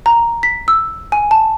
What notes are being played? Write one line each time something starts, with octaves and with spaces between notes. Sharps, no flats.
A#5
B6
E6
G#5
A5